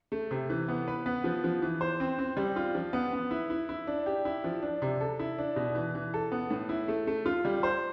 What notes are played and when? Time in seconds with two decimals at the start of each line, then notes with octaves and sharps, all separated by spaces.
0.12 A3
0.31 C3
0.50 E3
0.68 B3
0.88 B4
1.06 B3
1.24 F3
1.44 F3
1.62 E3
1.81 C5
2.00 C4
2.19 C4
2.37 G3
2.56 F4
2.75 F3
2.93 B3
3.13 B3
3.31 E4
3.50 E4
3.69 E4
3.87 D4
4.06 G4
4.25 E4
4.44 F3
4.62 D4
4.82 C3
5.01 A4
5.19 E4
5.38 D4
5.56 B2
5.75 E3
5.95 E3
6.14 A4
6.32 B3
6.51 A2
6.69 E4
6.88 A3
7.07 A3
7.26 F4
7.45 G3
7.63 C5